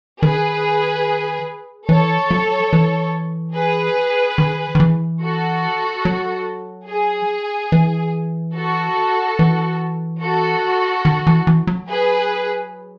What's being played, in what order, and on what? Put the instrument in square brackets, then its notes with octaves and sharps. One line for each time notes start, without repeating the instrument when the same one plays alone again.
[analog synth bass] D#3 [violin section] G#4 B4
[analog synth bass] E3 [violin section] A4 C#5
[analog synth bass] F#3
E3
[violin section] G#4 B4
[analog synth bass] D#3
D#3
E3
[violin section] F#4 A4
[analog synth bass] F#3
[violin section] G#4
[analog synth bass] E3
[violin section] F#4 A4
[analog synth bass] E3
[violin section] F#4 A4
[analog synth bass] D#3
E3
E3
F#3
[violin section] G#4 B4